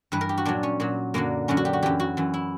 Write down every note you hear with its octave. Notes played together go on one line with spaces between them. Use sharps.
G2 E3 B4
A#4
G4
F#4
A#2 F#3 D4
C#4
A#2 F#3
F#2 D3 F#3 A#3
F#2 D3 F#3 C#4
F#4
G4
F#4
F#2 E3 G4
F#4
F#2 E3
E4